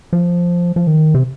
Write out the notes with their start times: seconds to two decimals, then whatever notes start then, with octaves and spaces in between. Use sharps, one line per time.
0.13 F3
0.76 F3
0.87 D#3
1.14 C3